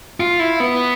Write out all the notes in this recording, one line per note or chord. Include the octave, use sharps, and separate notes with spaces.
F4
E4
B3